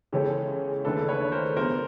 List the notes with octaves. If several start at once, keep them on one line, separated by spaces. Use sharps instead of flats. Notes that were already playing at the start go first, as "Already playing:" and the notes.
C#3 E3 G#3 C#4 G4 A4
D#2 C#3 E3 A3 D4 A4 B4
B4 C#5
A#4 C5
F3 G#3 B3 D4 A#4 C5